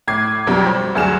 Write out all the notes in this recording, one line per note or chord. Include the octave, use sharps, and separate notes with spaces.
A2 D6 G#6 C7
B1 F2 F#3 G3
C5
D2 G2 F#3 G#4 F6 E7